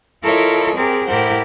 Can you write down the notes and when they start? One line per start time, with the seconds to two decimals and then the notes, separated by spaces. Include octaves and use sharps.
0.23 E4 F4 A4 A#4 C#5 D#5
0.76 C4 G4 G#4 A#4
1.07 A2 E4 G4 A#4 C5 F#5